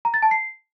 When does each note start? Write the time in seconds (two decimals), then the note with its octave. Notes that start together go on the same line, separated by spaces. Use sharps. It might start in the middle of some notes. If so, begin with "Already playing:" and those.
0.05 A#5
0.14 A6
0.22 A5
0.31 C7